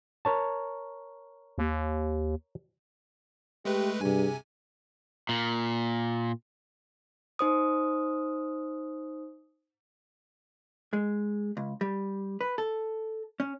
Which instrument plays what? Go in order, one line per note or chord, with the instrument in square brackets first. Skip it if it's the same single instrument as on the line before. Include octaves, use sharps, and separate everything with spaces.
[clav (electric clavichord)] A#4 C#5 A5
[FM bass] D#2
[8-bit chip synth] G#3 A3 B4 [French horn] G4
[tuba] G2 [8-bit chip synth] C3 G#5 [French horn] G#4
[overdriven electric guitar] A#2
[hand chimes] D#4 C5 D#6
[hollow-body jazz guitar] G#3
C#2
G3
B4
A4
C#4